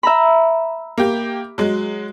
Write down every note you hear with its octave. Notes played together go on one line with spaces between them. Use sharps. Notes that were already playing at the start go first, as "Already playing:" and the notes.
E5 A#5 B5
A#3 G4
F#3 G#3